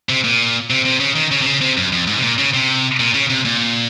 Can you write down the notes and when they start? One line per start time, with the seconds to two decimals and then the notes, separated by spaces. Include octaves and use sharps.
0.09 C3
0.24 A#2
0.70 C3
0.85 C3
1.00 C#3
1.16 D#3
1.31 C#3
1.42 C3
1.46 C#3
1.61 C3
1.77 F#2
1.92 F2
2.07 G#2
2.16 C3
2.23 A#2
2.38 C#3
2.54 C3
3.00 A#2
3.14 C#3
3.30 C3
3.45 A#2